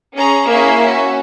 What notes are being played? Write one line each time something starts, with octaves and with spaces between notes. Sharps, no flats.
C#4 G#4 A#5
A#3 C#4 E4 G#4 E5
C#4 F#4